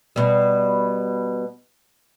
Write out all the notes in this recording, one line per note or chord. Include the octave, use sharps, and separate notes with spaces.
B2 G3